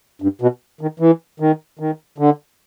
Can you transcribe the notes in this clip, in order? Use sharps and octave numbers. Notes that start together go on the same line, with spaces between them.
G2
B2
D#3
E3
D#3
D#3
D3